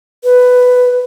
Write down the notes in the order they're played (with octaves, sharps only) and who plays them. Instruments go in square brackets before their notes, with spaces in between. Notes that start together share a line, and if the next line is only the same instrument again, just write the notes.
[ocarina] B4